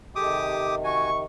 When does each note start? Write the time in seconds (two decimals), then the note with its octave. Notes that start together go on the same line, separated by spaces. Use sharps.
0.16 C3 D#3 G#3 G4 A4 D6 D#6
0.46 A4
0.84 F#4 G#5 C#6